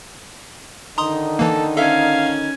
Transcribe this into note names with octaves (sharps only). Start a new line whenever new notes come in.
D3 D#3 D#4 A#5 C6 D#6
E3 A#3 A4
C#4 A4 E5 F5 G#5